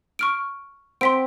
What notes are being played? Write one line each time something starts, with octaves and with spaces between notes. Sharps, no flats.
C#6 F6 D7
C4 C6 B6 D7